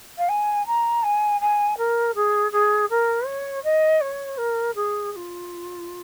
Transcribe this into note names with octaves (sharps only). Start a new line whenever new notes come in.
F5
G#5
A#5
G#5
G#5
A#4
G#4
G#4
A#4
C#5
D#5
C#5
A#4
G#4
G#4
F4